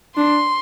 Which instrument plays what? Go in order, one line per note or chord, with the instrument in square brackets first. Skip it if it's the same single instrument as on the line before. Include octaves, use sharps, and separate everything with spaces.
[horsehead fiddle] D4 [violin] C6